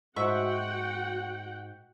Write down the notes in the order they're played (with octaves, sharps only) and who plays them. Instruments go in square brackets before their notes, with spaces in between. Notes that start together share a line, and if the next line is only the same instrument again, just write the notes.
[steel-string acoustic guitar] G#2 [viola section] F#4 F#5 G5 [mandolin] E5 C#6 E6